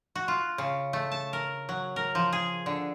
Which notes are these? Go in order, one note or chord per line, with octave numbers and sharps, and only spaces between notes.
F#4
F4
C#3
A3
A5
A#4
F#3
A#4
F3
G#4
D3